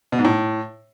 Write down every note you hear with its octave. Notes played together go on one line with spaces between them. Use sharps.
B2
G#2
A2